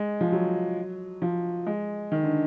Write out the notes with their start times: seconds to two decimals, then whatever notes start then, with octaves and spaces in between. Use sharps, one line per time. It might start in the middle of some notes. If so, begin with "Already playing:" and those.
Already playing: G#3
0.21 F3
0.32 F#3
1.22 F3
1.66 G#3
2.12 D#3
2.24 D3